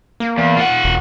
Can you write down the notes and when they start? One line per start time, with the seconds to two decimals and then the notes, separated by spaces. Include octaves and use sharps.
0.20 A#3
0.38 E2
0.57 F4 F#5
0.84 E1